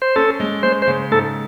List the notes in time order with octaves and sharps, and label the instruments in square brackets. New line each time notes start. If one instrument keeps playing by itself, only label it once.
[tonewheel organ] C5
[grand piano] C#4 [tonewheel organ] A4
[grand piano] G#3
[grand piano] G#3 [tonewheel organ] C5
[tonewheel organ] C5
[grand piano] C#3
[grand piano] G#2 [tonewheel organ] A4